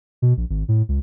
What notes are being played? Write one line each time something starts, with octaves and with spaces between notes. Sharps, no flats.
B2
A#1
G#1
A2
C#2